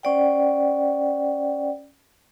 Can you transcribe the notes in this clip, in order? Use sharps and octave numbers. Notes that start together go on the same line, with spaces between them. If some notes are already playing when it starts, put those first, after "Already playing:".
C#4 C5 D5 F#5 G5